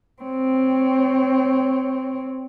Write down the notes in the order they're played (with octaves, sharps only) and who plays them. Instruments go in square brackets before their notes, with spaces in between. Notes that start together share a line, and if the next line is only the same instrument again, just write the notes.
[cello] C4 C#5